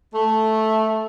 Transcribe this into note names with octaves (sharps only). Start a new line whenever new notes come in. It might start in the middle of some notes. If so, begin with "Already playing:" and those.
A3